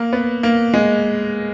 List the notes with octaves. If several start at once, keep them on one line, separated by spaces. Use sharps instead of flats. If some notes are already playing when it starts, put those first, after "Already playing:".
Already playing: A#3
B3
A#3
G#3